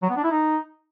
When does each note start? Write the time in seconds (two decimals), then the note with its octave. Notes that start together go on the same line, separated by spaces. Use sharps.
0.02 F#3
0.09 B3
0.17 D4
0.24 E4
0.31 D#4